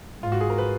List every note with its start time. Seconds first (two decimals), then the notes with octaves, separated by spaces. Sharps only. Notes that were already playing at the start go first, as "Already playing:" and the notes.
0.22 G#2 F4
0.32 F#4
0.41 G#4
0.50 A#4
0.58 B4